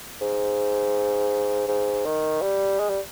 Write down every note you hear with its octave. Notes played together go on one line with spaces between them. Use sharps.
G#2
G#2
D#3
G3
G#3
G3